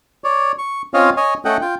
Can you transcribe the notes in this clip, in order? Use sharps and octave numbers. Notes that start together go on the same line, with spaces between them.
C#5 D5
C#6
C4 C#4 F4 C#5 D#5 F5
C#5 D#5 G#5
A3 C#4 A4 D#5 F#5 G5
F4 G5